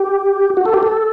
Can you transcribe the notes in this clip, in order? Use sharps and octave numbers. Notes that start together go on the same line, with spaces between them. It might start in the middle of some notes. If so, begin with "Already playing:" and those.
Already playing: G4
F#4
A4
G4
A4